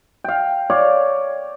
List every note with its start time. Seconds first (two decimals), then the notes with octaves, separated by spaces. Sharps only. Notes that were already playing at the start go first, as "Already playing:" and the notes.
0.24 F5 G5
0.70 C#5 D5 F5